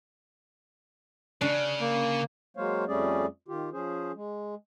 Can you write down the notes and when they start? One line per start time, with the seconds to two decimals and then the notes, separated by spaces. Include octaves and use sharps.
1.41 C#3 D4
1.80 A#3
2.57 F#3 G#3 A#3 C5 C#5 F5
2.88 F2 G3 A3 C#4 G#4 D5
3.48 D#3 F4 G4
3.73 F3 C#4 G#4 C5
4.15 G#3